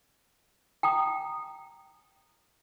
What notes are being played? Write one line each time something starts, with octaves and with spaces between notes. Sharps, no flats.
G5 A#5 D#6